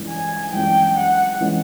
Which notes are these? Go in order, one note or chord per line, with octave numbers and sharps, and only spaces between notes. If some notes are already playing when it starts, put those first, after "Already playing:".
Already playing: G2 E3 G#3 C#4
G#5
G2 E3 G#3 C#4 E4 G5
F#5
E3 G#3 C#4 E4